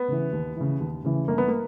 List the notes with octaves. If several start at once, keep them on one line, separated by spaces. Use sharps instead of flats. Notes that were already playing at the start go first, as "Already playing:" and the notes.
Already playing: B3
C#3 E3
D#2
C#3 E3
D#2
C#3 E3
G1 A#3
B3
A#3